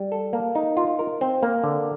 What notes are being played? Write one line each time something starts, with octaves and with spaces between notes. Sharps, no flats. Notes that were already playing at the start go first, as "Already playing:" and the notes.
Already playing: G3
A4
A#3
D#4
F4
A#4
C4
A#3
D3